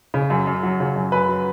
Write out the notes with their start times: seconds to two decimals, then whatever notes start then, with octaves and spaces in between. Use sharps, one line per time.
0.14 C#3
0.30 F#2
0.47 F#2
0.63 F#3
0.80 C#3
0.96 F#2
1.12 F#2 B4
1.29 F#3